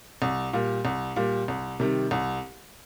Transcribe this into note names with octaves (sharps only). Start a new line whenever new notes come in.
C2
A#2 G3
C2
A#2 G3
C2
C3 D#3 G3
C2